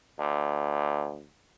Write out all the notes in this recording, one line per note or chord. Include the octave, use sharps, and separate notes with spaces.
D2